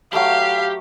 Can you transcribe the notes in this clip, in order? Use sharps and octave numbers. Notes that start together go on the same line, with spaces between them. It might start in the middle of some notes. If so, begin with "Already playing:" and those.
F#3 A3 G4 F5 B5